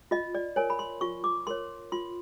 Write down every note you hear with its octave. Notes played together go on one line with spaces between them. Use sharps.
F4 D#5
D5
A#4 C#5 G#5
B5
C6
F4 C#6
D6
A#4 C#5 C6
F4 C6